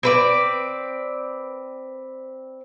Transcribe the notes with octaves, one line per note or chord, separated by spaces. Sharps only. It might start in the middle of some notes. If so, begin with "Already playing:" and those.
C4 B4 D5